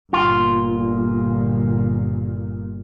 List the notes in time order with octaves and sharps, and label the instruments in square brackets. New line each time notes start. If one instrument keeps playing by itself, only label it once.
[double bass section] G1 A#2 [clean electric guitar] F4